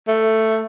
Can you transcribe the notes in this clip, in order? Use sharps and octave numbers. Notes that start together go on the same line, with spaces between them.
A3